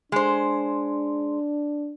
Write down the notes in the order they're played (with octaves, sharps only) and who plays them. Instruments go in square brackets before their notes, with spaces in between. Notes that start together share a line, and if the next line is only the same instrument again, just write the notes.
[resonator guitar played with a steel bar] G#3 C5 [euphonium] D4